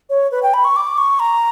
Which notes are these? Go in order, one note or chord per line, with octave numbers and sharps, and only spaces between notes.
C#5
B4
G5
B5
C#6
D6
C#6
A#5